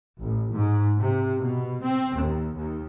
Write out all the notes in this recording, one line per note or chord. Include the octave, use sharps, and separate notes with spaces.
A1
G#2
C3
B2
C4
D#2
D#2